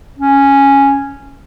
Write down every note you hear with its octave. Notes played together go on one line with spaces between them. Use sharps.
C#4